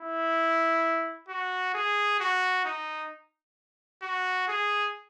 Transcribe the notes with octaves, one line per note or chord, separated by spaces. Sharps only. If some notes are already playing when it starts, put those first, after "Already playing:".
Already playing: E4
F#4
G#4
F#4
D#4
F#4
G#4